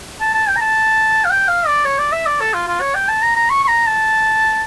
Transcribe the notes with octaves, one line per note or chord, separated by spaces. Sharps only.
A5
A5
G5
A#5
A5
F5
G5
F5
D5
C#5
D5
E5
D5
A4
F4
F4
C#5
G5
A5
A#5
A#5
C#6
C#6
A#5
A5